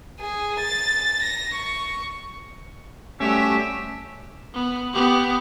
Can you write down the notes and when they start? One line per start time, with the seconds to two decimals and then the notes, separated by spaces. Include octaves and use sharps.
0.20 G#4
0.60 A6
1.23 A#6
1.54 C#6
3.20 G3 A3 C4 C#4 F#4 G4 E5
4.54 B3
4.93 B3 G4